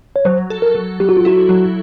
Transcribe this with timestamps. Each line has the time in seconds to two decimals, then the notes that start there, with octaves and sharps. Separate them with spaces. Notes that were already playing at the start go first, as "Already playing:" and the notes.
0.16 C#5
0.25 F#3 C5
0.50 A4
0.62 A#4
0.75 F#3
1.00 F#3 G4
1.09 F#4
1.17 F4
1.25 E4 F#4
1.49 F#3